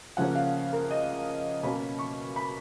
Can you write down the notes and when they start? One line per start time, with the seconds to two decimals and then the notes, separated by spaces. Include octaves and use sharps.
0.17 C#3 F3 A#3 C#4 F#5
0.35 F5
0.73 A#4
0.91 D#5
1.63 B2 A#3 C#4 B5
1.99 C#6
2.36 B5